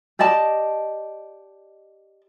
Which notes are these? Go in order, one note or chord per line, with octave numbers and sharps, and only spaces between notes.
G4 D5 D#5 A5